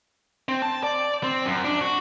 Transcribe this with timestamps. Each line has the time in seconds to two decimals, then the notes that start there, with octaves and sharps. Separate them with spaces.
0.49 C4
0.62 A5
0.83 D5
1.24 C4
1.45 F#2
1.64 D4
1.81 F#4